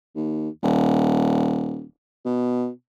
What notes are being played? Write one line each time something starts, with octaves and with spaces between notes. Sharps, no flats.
D#2
D#1
B2